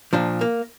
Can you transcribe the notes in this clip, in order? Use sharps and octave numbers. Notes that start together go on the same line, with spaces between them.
A#2 F3 D4
A#3